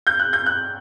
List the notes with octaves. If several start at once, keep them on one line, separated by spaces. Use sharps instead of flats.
G6
F#6
G6
F#6